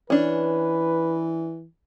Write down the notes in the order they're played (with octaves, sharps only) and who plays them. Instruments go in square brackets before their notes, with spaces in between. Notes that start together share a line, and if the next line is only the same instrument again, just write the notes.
[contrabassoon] E3 [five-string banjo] C#4 D4 [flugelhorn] B4